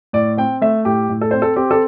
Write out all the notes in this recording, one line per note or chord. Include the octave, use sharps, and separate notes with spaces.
A2 D5
C4 G5
A3 E5
A2 G4
A2
A4
C4 C5
A4
C4 G4
A4